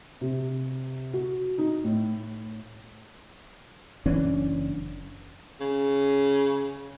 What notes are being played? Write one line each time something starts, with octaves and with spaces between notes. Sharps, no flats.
C3
F#4
D#4
A2
F#1 E3 C#4 D4
C#3